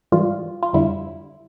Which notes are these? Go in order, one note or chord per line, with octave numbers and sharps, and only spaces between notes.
G#2 E3 G3 F4
F4
F2 D3 G3 E4